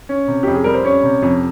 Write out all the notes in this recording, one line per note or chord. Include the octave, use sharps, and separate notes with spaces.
C#4
C3
F2 G4
G#4
G3 A#4
C5
C#4 C#5
C3
F2